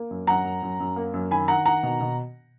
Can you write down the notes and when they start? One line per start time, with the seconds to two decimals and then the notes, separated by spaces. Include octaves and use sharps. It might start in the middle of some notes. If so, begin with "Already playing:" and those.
Already playing: A#3
0.11 F#2
0.27 F#2 F#5 A#5
0.45 F#2
0.62 F#2
0.80 F#2
0.96 A#3
1.14 F#2
1.31 D#3 G#5 B5
1.48 D#3 F#5 A#5
1.66 D#3 F#5 A#5
1.83 B2
2.00 B2